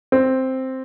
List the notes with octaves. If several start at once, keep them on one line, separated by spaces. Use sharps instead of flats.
C4